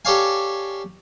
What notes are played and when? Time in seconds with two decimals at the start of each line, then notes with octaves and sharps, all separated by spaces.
0.05 G4 A4 C#5 D5 F5 G#5